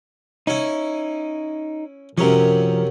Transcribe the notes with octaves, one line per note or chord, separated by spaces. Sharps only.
C#4 D#4 E4
F#2 C3 F3 C#4 A#4